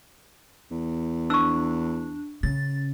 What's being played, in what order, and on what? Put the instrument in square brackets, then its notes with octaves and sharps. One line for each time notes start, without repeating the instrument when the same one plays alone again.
[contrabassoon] E2
[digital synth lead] D4 [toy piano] C#6 E6
[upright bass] C#3 [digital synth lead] A6